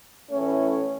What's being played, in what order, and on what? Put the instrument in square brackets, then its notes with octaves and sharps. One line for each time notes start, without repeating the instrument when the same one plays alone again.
[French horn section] A2 E3 A3 C#4